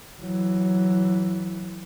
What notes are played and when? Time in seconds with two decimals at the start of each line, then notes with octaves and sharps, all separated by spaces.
0.21 E3 F#3